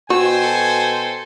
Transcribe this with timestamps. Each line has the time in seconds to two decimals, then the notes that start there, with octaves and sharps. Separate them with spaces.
0.10 B2 F#4 C5 G5 G#5 E6
0.42 A4